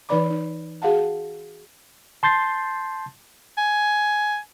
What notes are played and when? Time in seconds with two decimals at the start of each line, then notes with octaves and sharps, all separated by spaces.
0.09 E3 D#4 B4 D5 B5 D6
0.30 D#4
0.82 F#4 G#4 F5 F#5 A5
2.23 A5 C6 G6 A6 C7
3.58 G#5